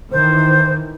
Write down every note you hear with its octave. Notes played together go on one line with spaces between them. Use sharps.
D#3 E3 C5